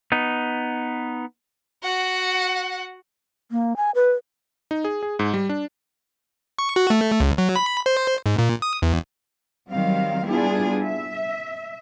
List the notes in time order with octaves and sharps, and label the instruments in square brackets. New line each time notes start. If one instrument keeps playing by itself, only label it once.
[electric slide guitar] B3 D#4
[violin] F#4 F#5
[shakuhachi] A#3
G#5
B4
[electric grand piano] D#4
G#4
G#4
G#2
G3
D4
[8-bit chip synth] C#6
F#4
A3
C#2
F#3
B5
C5
G#2
A#2
D#6
E2
[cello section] D#3 F#3 G3 C4 F5
G3 B3 D4 E4 F4 G#4
E5